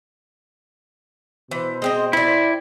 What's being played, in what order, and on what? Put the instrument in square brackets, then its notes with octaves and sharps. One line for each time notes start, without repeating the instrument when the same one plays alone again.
[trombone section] B2 C5 [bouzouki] E3
[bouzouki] G#3 C4 D#5
[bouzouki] C4 D5 [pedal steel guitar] E4